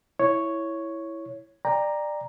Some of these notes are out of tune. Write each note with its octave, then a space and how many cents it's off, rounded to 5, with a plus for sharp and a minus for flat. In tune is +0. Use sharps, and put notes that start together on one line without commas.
E4 +0 C#5 +0
D5 +20 G5 +30 A#5 +0